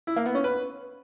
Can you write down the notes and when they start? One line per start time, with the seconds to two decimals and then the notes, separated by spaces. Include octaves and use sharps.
0.07 E4
0.16 A#3
0.26 B3
0.35 C#4
0.44 B4